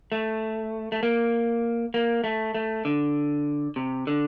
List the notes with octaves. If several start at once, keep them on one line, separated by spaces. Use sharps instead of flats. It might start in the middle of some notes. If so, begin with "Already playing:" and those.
A3
A3
A#3
A#3
A3
A3
D3
C3
D3